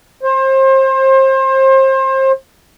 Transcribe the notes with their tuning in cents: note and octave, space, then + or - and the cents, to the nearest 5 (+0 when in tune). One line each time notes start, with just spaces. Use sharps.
C5 +30